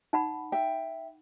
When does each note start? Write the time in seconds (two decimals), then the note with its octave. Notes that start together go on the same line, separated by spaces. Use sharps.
0.13 D#4 F#5 B5
0.52 E5 G5